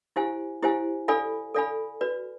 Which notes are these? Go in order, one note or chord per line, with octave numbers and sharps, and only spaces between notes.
E4 G4 C5 F5 G#5
E4 G4 C5 F5 G#5
A4 D5 F5 G#5 B5
A4 D5 F5 G#5 B5
F#4 B4 D5